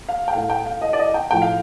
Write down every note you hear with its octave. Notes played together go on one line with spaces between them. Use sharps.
F5
G5
A2 A3 F5
G5
F5
D#5
D5
D#5
G5
A2 F3 A3 G5
F5